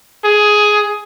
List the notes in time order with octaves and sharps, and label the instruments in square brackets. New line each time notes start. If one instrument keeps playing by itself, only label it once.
[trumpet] G#4